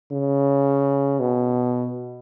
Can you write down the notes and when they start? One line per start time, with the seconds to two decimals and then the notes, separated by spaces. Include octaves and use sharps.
0.12 C#3
1.20 B2